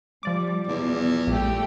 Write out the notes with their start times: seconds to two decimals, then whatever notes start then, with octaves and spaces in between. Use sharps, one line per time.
0.23 F3 G3 D5 D6
0.67 E2 B2
1.27 A#1 G3 A3 G4